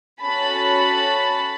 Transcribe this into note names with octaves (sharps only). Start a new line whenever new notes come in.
C#4 F#4 A4 A5 B5